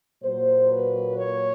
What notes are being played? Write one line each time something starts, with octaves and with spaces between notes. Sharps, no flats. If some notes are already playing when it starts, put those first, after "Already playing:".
A#2 F#3 A#3 C5
B4
C#5